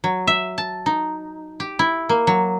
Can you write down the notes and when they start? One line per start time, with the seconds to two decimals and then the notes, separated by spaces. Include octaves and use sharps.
0.04 F#3
0.27 E5
0.58 A5
0.86 D#4
1.60 G4
1.79 E4
2.09 A#3
2.27 F#3